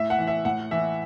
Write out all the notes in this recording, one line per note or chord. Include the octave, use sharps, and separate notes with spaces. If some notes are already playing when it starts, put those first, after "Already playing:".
Already playing: A2 E5
F#5
E3
E5
A2 F#5
E3 E5